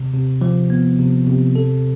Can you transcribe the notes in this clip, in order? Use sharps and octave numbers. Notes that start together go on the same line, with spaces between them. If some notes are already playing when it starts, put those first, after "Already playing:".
Already playing: C3
C3
F3
B3
C3
C3
A4